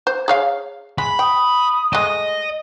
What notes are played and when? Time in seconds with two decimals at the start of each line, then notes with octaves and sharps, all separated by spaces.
0.07 C5
0.28 G#4 C#5 F5
0.98 G#3 B5
1.19 G5 D#6
1.93 G#3 A3 D#5